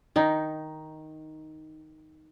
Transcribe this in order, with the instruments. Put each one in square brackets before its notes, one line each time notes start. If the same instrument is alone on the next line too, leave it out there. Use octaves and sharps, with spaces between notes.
[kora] D#3 D#4